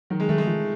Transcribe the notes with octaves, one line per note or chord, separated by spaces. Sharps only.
D#3 F#3
G#3
D#3 A3
G#3
F3